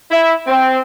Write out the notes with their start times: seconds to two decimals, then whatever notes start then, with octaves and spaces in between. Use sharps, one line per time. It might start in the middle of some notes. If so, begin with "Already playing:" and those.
0.11 E4
0.47 C4